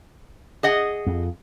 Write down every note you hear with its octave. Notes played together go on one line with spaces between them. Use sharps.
G#4 D#5 F#5
F2